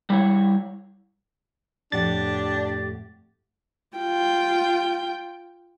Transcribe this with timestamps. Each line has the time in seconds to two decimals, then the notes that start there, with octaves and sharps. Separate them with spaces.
0.10 G3 E4 C#5
1.92 F2 A2 D4 G4 F#5 A6
3.97 F4 G5